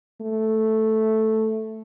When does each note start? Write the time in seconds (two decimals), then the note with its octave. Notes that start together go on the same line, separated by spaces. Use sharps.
0.21 A3